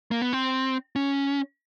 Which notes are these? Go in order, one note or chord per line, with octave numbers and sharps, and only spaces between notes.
A#3
B3
C4
C#4